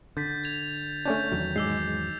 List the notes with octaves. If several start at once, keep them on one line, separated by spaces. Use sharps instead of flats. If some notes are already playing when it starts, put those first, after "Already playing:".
D3 G6 A6 B6
G#6 F7
A3 C#4 D4 G6
E2 D#3 F#3
G#2 G#3 D6 E6 C7